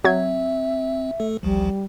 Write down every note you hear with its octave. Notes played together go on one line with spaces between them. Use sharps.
F#3 C4 E5 G#6
A3 A4
A1 D2 F3 G3